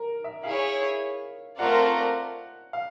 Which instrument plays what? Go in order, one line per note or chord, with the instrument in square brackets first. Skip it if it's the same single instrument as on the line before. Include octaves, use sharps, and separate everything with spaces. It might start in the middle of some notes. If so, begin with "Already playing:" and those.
Already playing: [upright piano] A#4
E5
[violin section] E4 G#4 C#5 [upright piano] F5
[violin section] A3 C4 F4 A#4 D5 [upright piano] F#5
[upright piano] F5